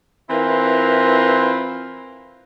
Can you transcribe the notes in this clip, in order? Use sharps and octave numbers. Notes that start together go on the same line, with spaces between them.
E3 C4 E4 F4 A#4 B4